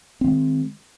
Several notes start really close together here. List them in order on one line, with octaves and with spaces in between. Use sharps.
C4 D#3 G#3